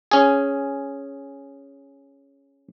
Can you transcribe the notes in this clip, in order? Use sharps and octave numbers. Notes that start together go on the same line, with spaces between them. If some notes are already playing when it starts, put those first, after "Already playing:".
C#4 G#4